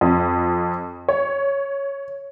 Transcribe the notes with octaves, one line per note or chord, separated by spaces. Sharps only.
F2
C#5